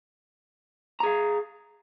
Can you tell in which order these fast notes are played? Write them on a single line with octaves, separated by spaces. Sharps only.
A#5 G#4 F5